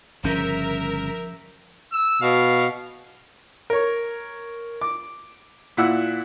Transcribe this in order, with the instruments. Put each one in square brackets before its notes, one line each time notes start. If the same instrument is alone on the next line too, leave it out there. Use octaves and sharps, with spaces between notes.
[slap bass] G1 C#3 C#4 [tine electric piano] F3 G6 A#6 [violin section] A#4 E5
[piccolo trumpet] E6
[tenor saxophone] B2 [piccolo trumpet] F5
[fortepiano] A#4 C#5
D6
A#2 E4 F#5 E6 F#6